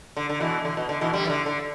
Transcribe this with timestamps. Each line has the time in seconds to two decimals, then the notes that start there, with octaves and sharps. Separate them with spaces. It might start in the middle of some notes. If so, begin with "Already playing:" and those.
0.17 D3
0.30 D3
0.40 B2 E3
0.65 D3
0.77 B2
0.89 D3
1.01 B2 E3
1.13 D3 G3
1.26 E3
1.30 D3
1.46 D3